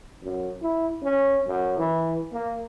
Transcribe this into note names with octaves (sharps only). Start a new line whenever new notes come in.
F#2
E4
C#4
F#2
E3
A#3